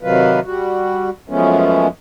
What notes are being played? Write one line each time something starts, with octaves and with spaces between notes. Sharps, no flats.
C3 D#3 F#3 F4 B4
G3 F#4
F#2 F3 G#3 A3 B3 C#4